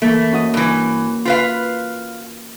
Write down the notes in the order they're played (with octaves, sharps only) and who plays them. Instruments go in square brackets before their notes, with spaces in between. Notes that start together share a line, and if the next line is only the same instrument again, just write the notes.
[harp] E3 A#3 [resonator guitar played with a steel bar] A3
[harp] C#4 F#4 D#5
[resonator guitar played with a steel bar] G2 E3
F4 B4 F5